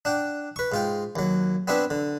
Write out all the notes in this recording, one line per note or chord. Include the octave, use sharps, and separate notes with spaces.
D4 F#5 G5
B4 C#6
G#2 F4 G5
D#2 F#3
B3 C4 D4 E4 B4
D3